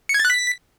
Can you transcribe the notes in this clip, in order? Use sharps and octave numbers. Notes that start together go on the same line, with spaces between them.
C#7
G#6
A6
F#6
B6